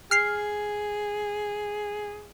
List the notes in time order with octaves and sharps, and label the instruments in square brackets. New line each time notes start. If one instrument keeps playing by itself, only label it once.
[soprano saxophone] G#4 [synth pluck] F6 C7